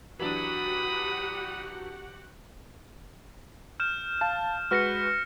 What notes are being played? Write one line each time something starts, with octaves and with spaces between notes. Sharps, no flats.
E3 F#3 D4 F#4 G4 F#5 B5 D#6
F6 G6 E7
F5 A5
G#3 F#4 B4 F6 A#6 C#7